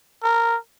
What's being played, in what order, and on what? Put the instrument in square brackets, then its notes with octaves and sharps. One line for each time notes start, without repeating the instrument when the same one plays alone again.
[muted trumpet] A#4